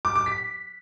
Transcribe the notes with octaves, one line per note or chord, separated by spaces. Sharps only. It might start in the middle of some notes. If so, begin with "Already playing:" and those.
D6
D6
B6